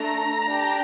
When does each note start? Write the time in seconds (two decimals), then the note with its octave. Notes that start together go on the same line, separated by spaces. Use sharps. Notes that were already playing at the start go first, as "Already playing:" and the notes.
Already playing: A3 D4 A4 A#5
0.47 D4 G4